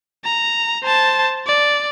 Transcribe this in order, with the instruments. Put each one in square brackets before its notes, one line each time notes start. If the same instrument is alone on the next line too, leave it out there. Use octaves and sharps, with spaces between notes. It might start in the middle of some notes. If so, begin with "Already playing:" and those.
[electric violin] A#5
C5 A5
D5